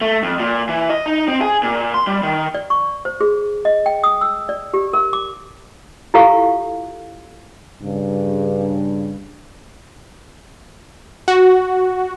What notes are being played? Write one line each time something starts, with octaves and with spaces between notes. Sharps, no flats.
A3
F2
A#2
E3
D#5
D#4
C4
G#4
A#2
C6
G3
D#3
D5
C#6
C5
G#4
D#5
G5
D#6
E6
D5
G4
A#4
D6
E4 F4 G4 A4 F5 C#6
G2 C#3
F#4